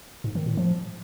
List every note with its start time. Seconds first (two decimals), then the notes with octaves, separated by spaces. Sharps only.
0.24 G#2
0.35 D#3
0.46 A2
0.57 F3